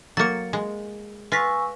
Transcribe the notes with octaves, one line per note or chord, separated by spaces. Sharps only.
F#3 A#3 A6 C#7
G#3
F4 B4 G#5 C#6 E6 A#6 B6